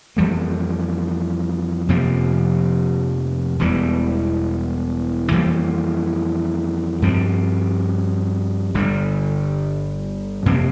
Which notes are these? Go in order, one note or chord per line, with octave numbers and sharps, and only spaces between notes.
F2 E3 G3 A#3
F2 C3 F3 A#3
E1 E2 E3 G3
F2 E3 G3 A#3
G2 F3 C4
G1 G2 D3 G3
F2 C3 E3 A#3